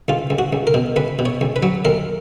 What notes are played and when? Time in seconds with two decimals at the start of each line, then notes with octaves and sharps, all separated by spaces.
0.08 C#2 F4
0.30 C#2
0.39 F#4
0.53 C#2
0.67 A#4
0.74 B2
0.96 C#2 B4
1.19 B2
1.25 C#5
1.41 C#2
1.56 B4
1.63 F#3
1.85 D#2 A#4